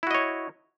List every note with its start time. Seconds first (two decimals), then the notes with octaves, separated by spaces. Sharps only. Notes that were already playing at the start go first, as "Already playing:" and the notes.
0.03 E4
0.07 F#4
0.11 D#5
0.15 C#5